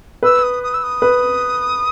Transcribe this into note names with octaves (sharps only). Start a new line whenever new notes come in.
B4 E6
D#6
D#6
E6
D#6
B4